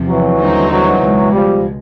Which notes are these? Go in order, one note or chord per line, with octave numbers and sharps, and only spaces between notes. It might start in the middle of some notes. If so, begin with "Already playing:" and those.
Already playing: E2 C3 F3
E3 F#3
D#2 D3 G3 C4 D#4
E3 F#3
C#2 B2 G#3
F3 G3